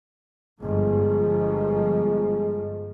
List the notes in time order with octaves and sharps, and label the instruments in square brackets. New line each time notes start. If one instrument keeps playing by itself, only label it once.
[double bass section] G1 F3 [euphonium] G#3